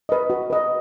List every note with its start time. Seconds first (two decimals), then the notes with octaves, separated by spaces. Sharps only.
0.09 B4 D#5
0.30 F#4
0.50 B4 D#5